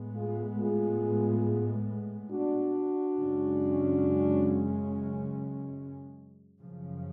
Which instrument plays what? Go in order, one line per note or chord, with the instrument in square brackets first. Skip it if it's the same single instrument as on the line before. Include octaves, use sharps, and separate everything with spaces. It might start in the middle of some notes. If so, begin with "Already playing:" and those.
Already playing: [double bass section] A2 G#3 B3
[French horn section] F4 G#4
F4 G#4
D4 F#4
[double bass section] F#2 C#3 G#3 C#4
F#2 C#3 F3